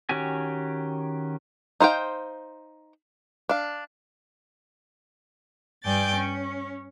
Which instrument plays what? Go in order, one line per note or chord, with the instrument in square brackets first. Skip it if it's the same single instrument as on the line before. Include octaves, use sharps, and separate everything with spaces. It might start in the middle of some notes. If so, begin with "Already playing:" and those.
[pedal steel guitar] D#3 C#4 F#4 G4 G#5
[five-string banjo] D#4 C5 F5 G5
D4 F5
[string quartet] G2 D5 G5 G#5 G6 A6
C#4